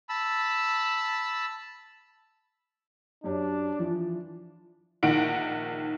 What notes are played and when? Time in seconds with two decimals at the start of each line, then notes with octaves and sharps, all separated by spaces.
0.09 A5 B5 E6
3.24 F#2 C#4 D4 G4
3.79 E3 F3
5.03 A#1 D#3 F#5 D7